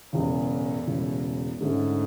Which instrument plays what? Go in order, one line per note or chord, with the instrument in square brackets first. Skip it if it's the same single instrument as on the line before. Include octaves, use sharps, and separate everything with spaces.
[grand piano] E1 E2 C#3 [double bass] A2
[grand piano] E1 E2 C#3
[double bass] G#2 [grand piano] D3 A3 C#4